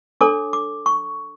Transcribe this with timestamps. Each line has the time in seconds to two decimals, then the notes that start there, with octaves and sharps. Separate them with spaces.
0.21 D4 A4 C#5 D6
0.53 D6
0.86 C#6